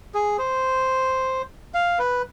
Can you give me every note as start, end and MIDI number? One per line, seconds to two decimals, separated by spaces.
0.14 0.37 68
0.39 1.42 72
1.74 1.99 77
1.99 2.22 71